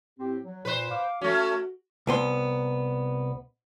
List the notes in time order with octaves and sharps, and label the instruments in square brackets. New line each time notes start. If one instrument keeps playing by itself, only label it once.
[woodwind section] A2 C4 G4
F#3
[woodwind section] A#2 [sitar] B4 C5
[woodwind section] F5 D6
[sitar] A3 C#4 [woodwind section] F#4
[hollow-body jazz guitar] C2 B3 C6